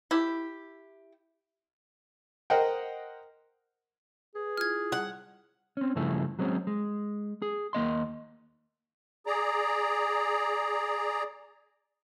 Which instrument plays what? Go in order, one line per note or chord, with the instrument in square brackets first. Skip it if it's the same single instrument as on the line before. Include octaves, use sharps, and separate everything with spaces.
[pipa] E4 G4
[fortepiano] A#4 C5 D#5 F#5 G5
[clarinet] G#4 [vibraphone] B4
[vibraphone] E4 F4 [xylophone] F6 G#6
[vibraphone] G3 [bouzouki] F#5
[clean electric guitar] C4 C#4
G2 C#3 F3 A3 E4 G#4
F#3 G#3 C4 C#4
G#3
G#4
D#2 A#3 D#5 C6
[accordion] G#4 D5 A#5